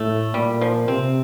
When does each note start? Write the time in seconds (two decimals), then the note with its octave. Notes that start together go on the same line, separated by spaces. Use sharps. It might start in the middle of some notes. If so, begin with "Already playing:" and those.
Already playing: A2 A3
0.34 A#2 G3
0.61 F3
0.88 C3 C4